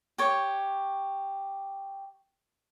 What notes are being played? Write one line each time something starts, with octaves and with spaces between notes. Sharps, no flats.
G4 C#5